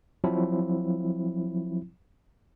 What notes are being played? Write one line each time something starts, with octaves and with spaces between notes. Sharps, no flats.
F3 F#3 C4 E4